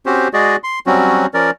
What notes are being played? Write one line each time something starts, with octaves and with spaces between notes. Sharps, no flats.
C4 C#4 F#4 G4 C5
G#3 F#4 G#4 D5 D#5
C6
F#3 G3 C4 C#4 F#4
F3 C#4 A#4 D5